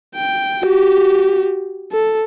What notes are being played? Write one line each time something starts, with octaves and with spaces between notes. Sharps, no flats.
G5
F#4 G4
A4